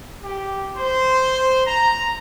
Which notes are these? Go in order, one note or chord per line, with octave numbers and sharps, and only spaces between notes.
G4
C5
A#5